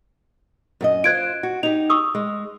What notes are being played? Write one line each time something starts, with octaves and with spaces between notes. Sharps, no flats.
F#2 G#4 D#5
F4 C5 F#6 G#6 D7
F#4
D#4 G4 F7
C#6 D#6 E6
G#3